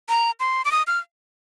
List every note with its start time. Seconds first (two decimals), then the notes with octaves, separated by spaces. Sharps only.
0.09 A#5
0.40 C6
0.65 D6
0.72 D#6
0.87 F6